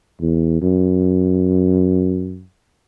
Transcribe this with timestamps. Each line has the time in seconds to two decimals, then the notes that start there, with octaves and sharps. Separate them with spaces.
0.20 E2
0.62 F#2